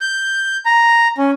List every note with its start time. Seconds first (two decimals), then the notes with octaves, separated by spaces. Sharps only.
0.01 G6
0.66 A#5
1.18 C#4